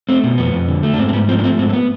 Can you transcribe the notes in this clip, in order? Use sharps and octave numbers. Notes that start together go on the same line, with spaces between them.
A3 C4
B2
F2 B3
F2
D3
A3
D4
G#2 C4
C4
G#2 B3
F3 C4
D4
A3 C4
G#2 C4
C4
B3